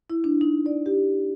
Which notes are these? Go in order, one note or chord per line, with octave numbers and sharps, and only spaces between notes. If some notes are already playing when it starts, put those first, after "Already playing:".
E4
D4
D#4
D5
G4